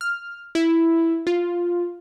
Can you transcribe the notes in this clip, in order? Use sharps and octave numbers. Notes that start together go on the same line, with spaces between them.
F6
E4
F4